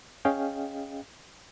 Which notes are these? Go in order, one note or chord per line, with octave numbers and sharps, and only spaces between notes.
C#4 G#4 D#5 F5 G5